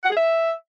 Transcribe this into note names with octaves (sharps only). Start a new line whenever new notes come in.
F#5
G#4
E5